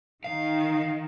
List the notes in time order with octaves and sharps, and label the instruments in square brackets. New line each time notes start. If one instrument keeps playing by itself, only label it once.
[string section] D#3 [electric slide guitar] F5